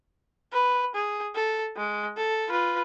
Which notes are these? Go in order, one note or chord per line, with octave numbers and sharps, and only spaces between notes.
B4
G#4
A4
G#3
A4
F4 B4